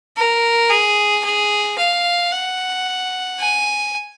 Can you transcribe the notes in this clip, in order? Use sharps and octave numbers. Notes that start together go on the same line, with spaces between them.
A#4
G#4
G#4
F5
F#5
G#5